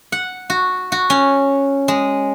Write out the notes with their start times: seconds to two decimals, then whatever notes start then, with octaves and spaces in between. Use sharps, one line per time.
0.12 F#5
0.50 F#4
0.92 F#4
1.10 C#4
1.88 G#3